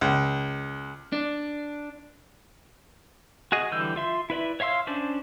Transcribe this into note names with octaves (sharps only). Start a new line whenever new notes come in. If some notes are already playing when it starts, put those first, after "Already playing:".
C#2
D4
F#4 G#4 D#5
D3 E3 G3 E6 G6
F4 E5 C6
E4 B4 D5 E5
C#5 E5 F5 C6 E6
C#4 D4 C5 D5